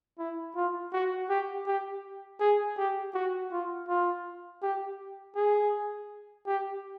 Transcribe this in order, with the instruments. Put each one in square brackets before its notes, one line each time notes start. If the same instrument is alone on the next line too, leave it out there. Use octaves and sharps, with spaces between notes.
[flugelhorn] E4
F4
F#4
G4
G4
G#4
G4
F#4
F4
F4
G4
G#4
G4